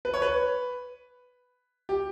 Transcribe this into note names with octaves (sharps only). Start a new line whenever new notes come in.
B4
C#5
B4
G4